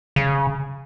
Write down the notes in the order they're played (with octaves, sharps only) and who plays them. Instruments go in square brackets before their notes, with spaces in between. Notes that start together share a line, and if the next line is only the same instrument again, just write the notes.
[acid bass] C#3